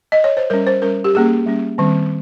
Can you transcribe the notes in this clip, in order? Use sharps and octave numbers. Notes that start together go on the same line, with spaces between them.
D#5
C#5
C5
G3 C#4 A#4
C5
G3 C#4 A#4
G4
G3 A#3 C#4 G#4
G3 A#3 C#4
D#3 G3 C4